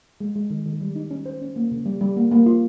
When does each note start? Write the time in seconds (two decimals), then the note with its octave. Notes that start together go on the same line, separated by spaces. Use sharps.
0.20 G#3
0.35 G#3
0.50 D#3
0.66 D#3
0.81 G3
0.96 D#4
1.11 C#4
1.26 C5
1.42 C#4
1.56 A#3
1.71 C#3
1.86 G3
2.01 G3
2.17 A#3
2.31 A#3
2.46 F4